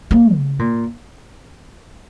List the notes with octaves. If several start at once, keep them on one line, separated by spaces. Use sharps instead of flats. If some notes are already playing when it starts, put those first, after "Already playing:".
A#3
C#3
A#2